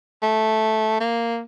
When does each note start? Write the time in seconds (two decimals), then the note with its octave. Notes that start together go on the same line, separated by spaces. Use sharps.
0.22 A3
1.00 A#3